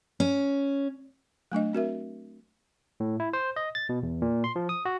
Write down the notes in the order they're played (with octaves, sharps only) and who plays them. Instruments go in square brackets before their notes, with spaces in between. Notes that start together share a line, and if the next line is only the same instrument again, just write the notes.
[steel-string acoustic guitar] C#4
[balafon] F#3 A3 D4 D#5
C4 F#4 A#4 E5
[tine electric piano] A2
E4
C5
D#5
A6
B2
E2
A#2
C6
F3
D#6
F#4